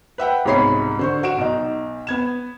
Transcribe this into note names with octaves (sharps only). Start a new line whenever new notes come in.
B4 E5 F#5 G5
C2 G#2 B2 C#5 B5 C7
D3 C5 C#6
F#4 D7 E7
B1 D#4
B3 G#6 E7